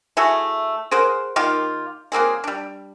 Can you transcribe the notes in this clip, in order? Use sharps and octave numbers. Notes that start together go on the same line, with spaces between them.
A3 E4 F#4 G#4
G#4 A#4 C5 F#5
D#3 A#3 F4 G4
F#3 A#3 C4 G#4
G3 D4